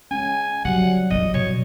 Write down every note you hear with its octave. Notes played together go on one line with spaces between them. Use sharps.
G#3 C#4 G#5
D3 F#3 G3 F#5
D#3 E3 D#5
B2 C#5